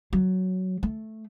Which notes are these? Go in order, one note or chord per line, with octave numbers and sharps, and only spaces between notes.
F#3
A3